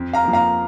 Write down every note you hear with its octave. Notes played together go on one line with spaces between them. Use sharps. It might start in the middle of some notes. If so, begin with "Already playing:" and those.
Already playing: F2
F5 A#5
F3 A#3
F5 A#5